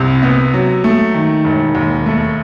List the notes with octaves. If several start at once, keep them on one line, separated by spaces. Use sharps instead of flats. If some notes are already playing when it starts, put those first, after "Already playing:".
Already playing: C2 C3
B3
F#3
A3
D#3
E1
D#2
A3